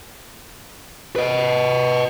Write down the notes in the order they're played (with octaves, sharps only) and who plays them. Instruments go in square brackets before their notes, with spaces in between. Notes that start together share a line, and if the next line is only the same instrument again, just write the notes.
[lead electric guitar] B4 D#5